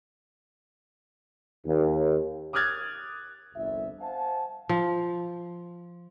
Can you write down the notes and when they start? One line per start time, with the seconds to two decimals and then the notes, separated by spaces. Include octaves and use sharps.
1.66 D#2
2.53 D6 D#6 F6 F#6 G#6 A6
3.55 G1 C2 F2 E5
4.01 C5 F5 F#5 G#5 A5
4.69 F3